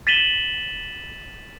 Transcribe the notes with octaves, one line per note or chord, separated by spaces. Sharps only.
A6 B6 D#7 E7 F#7 G7